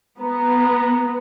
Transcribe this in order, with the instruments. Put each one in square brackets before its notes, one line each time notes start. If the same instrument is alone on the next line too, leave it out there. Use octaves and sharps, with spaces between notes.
[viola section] B3 [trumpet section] A#5